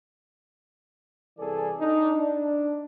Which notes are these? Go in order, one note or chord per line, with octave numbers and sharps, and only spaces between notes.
C2 E3 G#4 A4 D5 G#5
D4 D#4
D4